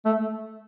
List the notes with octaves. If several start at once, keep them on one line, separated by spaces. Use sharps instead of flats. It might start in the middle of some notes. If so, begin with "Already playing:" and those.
A3